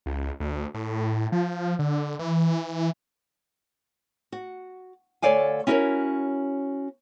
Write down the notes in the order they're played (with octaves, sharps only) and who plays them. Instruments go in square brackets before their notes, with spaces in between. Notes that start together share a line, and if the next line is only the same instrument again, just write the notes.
[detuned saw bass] C#2
D2
A2
F3
D3
E3
[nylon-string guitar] F#4
D2 A4 C#5 D5 F5 G#5
C#4 E4 F#4 A4 A#4 C#5